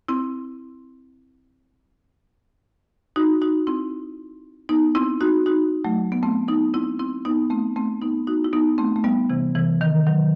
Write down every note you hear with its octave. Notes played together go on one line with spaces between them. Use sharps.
C4 E4
D#4 F#4
D#4 F#4
C4 E4
B3 D#4
C4 E4
D#4 F#4
D#4 F#4
F#3 A3
B3
A3 C4
B3 D#4
C4 E4
C4 E4
B3 D#4
A3 C4
A3 C4
B3 D#4
D#4 F#4
E4
B3 D#4
A3 C4
A3
G3 B3
C3 E3
C3 E3
D#3
D#3 F#3